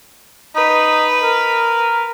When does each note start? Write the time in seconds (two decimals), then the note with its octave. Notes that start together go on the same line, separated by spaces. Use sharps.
0.56 D#4 B4
1.23 A#4